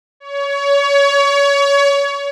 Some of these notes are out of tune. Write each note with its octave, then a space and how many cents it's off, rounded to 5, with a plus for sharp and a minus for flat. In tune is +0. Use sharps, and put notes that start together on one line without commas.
C#5 +25